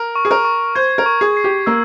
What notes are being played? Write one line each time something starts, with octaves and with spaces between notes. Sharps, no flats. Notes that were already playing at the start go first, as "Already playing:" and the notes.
Already playing: A#4
C#6
G#4
A#4
C#6
C5 G#6
A#4
C#6
G#4
C7
G4
A#3 E6